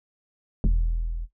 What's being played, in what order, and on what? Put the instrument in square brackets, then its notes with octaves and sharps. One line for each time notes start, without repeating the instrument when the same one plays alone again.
[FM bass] E1